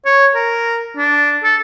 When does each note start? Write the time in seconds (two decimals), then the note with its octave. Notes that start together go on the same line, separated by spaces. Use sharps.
0.05 C#5
0.35 A#4
0.97 D4
1.44 A4